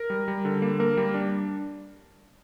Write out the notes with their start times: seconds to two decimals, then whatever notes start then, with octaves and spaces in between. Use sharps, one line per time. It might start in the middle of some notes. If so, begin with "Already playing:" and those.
Already playing: A#4
0.10 G3
0.28 G3
0.45 D3
0.62 A#3
0.80 A#3 A#4
0.97 G3
1.14 D4